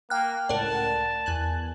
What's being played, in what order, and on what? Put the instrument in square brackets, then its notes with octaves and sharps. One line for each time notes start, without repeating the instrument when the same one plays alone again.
[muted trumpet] A#3 [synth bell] G5 F6 F#6
[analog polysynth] C#2 A2 F#5 [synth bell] A#4 D5 [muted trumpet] A5
[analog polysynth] E2 G#5 F#6